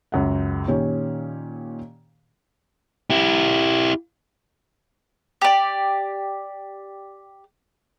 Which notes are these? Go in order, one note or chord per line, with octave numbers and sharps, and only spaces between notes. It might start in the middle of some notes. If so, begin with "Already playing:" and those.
C#2 F#2 F#5
A#2 D#3 C#4 G4
E4 G4
G4 D5